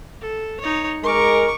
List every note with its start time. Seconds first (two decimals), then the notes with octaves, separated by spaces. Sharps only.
0.21 A4
0.60 D#4 C#5
1.03 G#3 A#4 C#6 D6